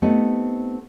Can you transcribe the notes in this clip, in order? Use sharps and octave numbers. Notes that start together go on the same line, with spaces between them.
A3 B3 C4 D#4 G4 D#5